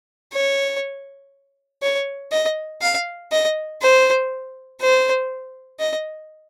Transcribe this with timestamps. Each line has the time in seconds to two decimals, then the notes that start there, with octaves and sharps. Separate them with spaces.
0.33 C#5
1.83 C#5
2.32 D#5
2.82 F5
3.32 D#5
3.82 C5
4.81 C5
5.80 D#5